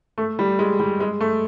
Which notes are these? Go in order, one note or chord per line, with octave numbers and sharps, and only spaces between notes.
A3
G3
G#3
G3
G#3
A3